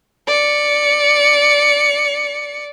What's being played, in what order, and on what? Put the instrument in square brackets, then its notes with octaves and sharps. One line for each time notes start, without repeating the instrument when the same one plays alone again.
[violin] D5 C#7